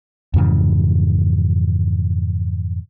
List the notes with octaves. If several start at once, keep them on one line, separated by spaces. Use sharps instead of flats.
F2 G#2 C#3 E3